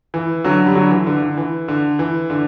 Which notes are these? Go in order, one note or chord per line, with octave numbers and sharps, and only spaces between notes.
E3
D3 F#3
G3
D3 F#3
E3
D3
D3
E3
D3
E3
D3